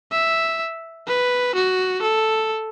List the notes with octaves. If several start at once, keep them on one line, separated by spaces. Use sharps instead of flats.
E5
B4
F#4
A4